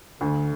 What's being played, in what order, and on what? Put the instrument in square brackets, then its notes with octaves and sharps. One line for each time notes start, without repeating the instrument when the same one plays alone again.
[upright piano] D2 [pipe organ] D3